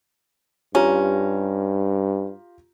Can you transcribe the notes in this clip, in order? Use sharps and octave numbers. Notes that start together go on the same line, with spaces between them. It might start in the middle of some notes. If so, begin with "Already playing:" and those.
G2 C#4 F4 G4 A#5